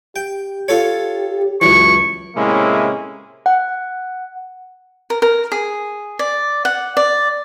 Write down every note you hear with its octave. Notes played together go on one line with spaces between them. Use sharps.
G4 G5
F4 A4 C#5
C#2 F#2 E3 C#6
A2 C3 G#3 A#3 C#4 E4
F#5
A#4
A#4
G#4
D5
F#5
D5